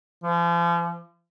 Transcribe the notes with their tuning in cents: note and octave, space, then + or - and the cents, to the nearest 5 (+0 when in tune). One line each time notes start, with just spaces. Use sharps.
F3 -40